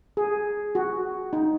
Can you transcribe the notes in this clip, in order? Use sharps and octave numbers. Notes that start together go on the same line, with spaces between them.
G#4
F#4
D#4